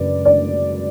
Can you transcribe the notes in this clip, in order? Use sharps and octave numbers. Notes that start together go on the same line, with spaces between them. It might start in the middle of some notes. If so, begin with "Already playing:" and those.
Already playing: F#2 C#3 B4 D5
D5